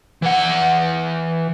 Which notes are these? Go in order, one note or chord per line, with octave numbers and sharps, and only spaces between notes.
E3 F#5